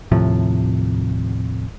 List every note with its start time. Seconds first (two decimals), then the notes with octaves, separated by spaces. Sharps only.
0.12 D#2 A2 C3 F3